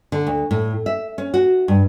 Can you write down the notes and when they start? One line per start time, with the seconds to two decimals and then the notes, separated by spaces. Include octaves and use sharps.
0.12 D3
0.27 D2
0.51 A2
0.86 E5
1.18 C#4
1.34 F#4
1.68 G2